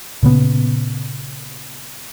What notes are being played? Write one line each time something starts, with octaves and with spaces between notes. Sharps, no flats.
A#2 C#3 B3